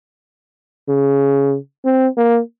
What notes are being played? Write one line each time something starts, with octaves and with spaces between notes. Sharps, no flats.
C#3
C4
A#3